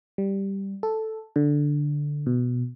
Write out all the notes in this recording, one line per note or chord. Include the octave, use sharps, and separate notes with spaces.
G3
A4
D3
B2